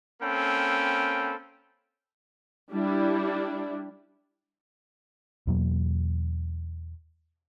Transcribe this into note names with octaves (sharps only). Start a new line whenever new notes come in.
A#3 C4 C#4 A4 G5 B5
G3 D4 E4
E2 B2 F#3 A#3